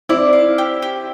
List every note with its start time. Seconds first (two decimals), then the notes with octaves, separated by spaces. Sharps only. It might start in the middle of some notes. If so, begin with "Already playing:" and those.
0.09 C4 E4 D5
0.33 F5
0.58 G4
0.82 G4